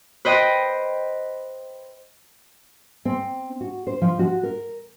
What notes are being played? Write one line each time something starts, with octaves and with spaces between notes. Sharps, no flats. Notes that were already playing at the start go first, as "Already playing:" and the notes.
B4 C5 D#5 G5
C4
F#4
C5
F3
F#4
A#4